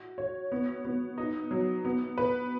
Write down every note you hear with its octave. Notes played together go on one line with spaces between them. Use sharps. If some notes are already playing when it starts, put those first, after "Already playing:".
Already playing: F#4
C#5
B3
B3
D#4
F#3
B3
B4